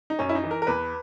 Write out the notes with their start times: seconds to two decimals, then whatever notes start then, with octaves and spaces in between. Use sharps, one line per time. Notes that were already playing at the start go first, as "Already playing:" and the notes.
0.10 D#4
0.19 F#2 C#4
0.29 E4
0.35 D#4
0.44 E3
0.51 A#4
0.62 A#4
0.67 E2 B4